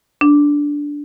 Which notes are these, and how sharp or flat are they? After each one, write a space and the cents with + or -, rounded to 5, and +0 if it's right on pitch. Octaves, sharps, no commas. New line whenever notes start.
D4 -10